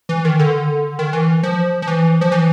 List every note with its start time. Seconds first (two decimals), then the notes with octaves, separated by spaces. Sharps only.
0.09 E3
0.25 D#3
0.39 D3
0.99 D#3
1.13 E3
1.43 F3
1.82 F3
1.88 E3
2.21 F3
2.32 E3